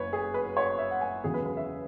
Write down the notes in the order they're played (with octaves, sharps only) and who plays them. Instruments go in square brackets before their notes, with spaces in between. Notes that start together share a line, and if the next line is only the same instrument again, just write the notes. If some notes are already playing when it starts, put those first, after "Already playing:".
Already playing: [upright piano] F#1 F#2 B4 C#5
G#4
B4
C#5
E5
F#5
G#5
E1 E2 C#3 F#3 G#4
B4
B4
E5